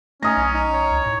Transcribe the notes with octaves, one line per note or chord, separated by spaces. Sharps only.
A3 C#4 D#4 G#5 D#6 A#6
B1
D#4
C#5
C#2
A2